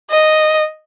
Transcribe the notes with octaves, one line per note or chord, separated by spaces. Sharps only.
D#5